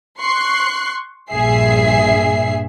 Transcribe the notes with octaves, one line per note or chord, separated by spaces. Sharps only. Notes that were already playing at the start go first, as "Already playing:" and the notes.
C6 C#6 F#6 C7
A#1 G2 A#2 G#4 E5 C7